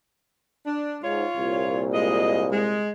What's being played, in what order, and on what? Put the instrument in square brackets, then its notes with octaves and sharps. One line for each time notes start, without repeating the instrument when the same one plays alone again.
[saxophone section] D4
[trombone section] G#2 [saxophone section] F4 C#5
[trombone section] C2 A#2
[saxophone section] G#3 D#5
G#3